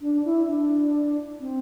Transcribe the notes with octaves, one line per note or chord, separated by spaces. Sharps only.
D4
E4
D4
C4